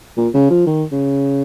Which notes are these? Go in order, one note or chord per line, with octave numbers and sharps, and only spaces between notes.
A#2
C#3
F3
D#3
C#3